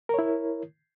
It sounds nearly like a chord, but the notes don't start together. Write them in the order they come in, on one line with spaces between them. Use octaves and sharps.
A#4 C#5 E4